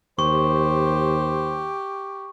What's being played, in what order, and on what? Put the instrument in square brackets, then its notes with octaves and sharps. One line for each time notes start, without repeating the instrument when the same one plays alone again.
[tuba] D#2 [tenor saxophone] G4 [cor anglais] C5 [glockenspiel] C#6